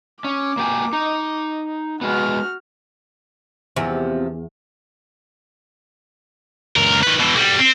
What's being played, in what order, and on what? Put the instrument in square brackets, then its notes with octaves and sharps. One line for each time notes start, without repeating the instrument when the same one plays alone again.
[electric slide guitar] C#4 [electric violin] D6
[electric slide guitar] A#3 G4 G#5
D#4
[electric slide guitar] G#3 B3 [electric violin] F#4 F6
[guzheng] E2 [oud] C3 F3
[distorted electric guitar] C#2 A#4
D#3 B4
B2 E3
B1 G3
C4